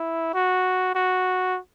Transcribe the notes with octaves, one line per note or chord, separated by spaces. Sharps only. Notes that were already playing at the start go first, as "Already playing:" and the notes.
Already playing: E4
F#4
F#4